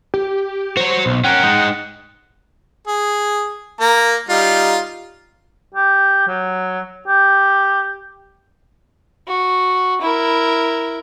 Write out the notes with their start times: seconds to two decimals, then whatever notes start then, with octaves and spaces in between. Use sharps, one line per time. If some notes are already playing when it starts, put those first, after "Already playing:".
0.14 G4
0.77 F#4 C5 C#5
1.06 B1
1.24 C#4 A#4 F#5 G5
1.43 G#3 D#4
2.87 G#4
3.80 A#3 A#5
4.29 G3 D#4 F4
5.74 G4
6.27 F#3
7.07 G4
9.28 F#4
10.01 E4 A#4